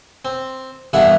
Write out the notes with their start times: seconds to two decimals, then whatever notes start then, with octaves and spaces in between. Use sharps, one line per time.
0.25 C4
0.93 C2 G2 E3 B3 E4 F#5